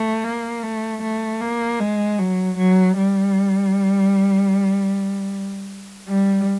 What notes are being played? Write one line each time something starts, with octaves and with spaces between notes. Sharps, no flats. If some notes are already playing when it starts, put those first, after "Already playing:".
Already playing: A3
A#3
A3
A3
A#3
G#3
F#3
F#3
G3
G3